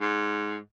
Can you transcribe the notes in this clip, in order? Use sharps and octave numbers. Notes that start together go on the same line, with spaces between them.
G#2